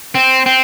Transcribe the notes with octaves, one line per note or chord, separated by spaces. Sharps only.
C4
C4